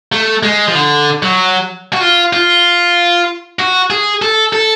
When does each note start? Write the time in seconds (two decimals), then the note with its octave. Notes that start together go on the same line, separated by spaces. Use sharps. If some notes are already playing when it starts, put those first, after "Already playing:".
0.12 A3
0.43 G#3
0.68 F3
0.75 D3
1.23 F#3
1.93 F#4
2.01 F4
2.33 F4
3.59 F#4
3.90 G#4
4.22 A4
4.53 A4